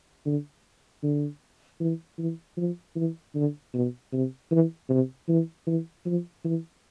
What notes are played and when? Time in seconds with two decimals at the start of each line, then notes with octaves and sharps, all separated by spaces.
0.26 D3
1.03 D3
1.80 E3
2.19 E3
2.57 F3
2.96 E3
3.35 D3
3.74 B2
4.13 C3
4.51 E3
4.90 C3
5.29 E3
5.67 E3
6.06 F3
6.45 E3